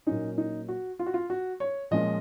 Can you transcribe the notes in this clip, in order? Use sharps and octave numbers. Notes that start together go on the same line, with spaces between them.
A#2 F#3 A#3 C#4 D#4
D#4
F#4
F4
F#4
F4
F#4
C#5
A#2 F3 G#3 C#4 D#5